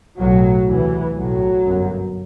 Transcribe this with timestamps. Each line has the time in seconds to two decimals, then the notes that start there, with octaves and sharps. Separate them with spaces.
0.18 B1 A2 F#3
0.67 D2 C3 E3
1.16 B1 A2 F#3
1.66 G1 F#2